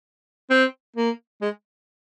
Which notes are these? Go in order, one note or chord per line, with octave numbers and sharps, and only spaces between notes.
C4
A#3
G#3